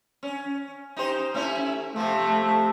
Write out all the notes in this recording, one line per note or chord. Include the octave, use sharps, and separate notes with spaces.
C#4
D#4 G4 C5
A3 C#4 E4
C3 F3 A3